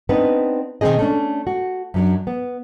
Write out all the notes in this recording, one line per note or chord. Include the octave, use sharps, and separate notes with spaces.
B3 C4 D4 D#4 B4
B2 D#3 F#3 C4 G#4 D#5
A3 C#4 D4
F#4
F#2 F#3 D4
B3